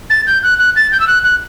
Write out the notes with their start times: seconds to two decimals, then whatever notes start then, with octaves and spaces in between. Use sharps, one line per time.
0.10 A6
0.27 G6
0.43 F#6
0.59 F#6
0.76 A6
0.92 G6
1.00 E6
1.08 F#6
1.24 F#6